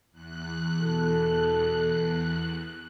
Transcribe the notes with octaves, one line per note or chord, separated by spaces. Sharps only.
E2 F#6
B2 A4